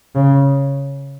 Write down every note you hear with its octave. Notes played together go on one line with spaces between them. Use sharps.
C#3